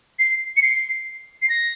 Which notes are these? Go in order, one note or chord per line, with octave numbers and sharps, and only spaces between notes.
C7
C#7
C7
C7
A#6